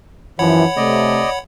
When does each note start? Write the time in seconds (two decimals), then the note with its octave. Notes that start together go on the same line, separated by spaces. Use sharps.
0.39 F#2 E3 F3 C#5 F#5 B5
0.77 C3 A3 D5 D#5